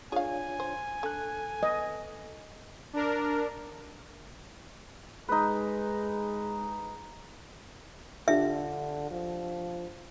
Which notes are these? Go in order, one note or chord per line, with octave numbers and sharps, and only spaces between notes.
D4 F4 G#4 C#5 F5 G#5
C5
D3 A4 F#6
B3 D#5
D4 A#4
G#3 D#4 B4
D3 D4 F4 G4 E5
F3